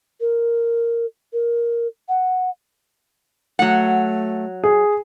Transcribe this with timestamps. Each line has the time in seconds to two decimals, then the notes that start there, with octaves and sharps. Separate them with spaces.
0.21 A#4
1.33 A#4
2.09 F#5
3.59 F#3 A3 F#5
4.64 G#4